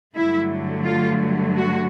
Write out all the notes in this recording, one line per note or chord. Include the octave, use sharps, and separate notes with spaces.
G2 D3 F#3 A3 E4
F4
F#4